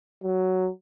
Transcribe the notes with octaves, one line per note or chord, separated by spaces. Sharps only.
F#3